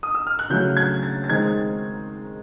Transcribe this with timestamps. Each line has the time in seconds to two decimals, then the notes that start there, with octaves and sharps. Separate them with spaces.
0.03 D#6
0.15 E6
0.27 F6
0.39 F#6
0.50 C#3 F#3 A3 C#4 G6
0.77 G#6
1.03 A6
1.24 A6
1.30 D#3 G#3 C4 G#6